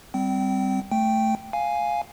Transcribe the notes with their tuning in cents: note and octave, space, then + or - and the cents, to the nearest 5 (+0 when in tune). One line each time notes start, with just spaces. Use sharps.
G3 +0 C4 -10 G5 -30
A3 +0 G5 +0
F5 +0 G#5 +0